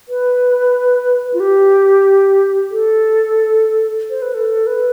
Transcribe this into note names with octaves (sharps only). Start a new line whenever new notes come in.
B4
F4
G4
A4
C5
B4
A4
B4